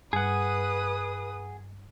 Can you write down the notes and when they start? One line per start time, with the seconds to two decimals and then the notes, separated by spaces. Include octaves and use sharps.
0.13 G2 G#4 B4 F#5 D#6